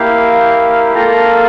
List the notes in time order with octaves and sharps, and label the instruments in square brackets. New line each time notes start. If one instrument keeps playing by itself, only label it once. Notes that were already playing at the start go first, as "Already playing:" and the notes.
Already playing: [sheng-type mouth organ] A#3 E4 G4 F5
A#3 F4 A4 A#5